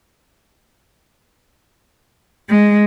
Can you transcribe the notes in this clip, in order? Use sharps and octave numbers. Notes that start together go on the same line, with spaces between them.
G#3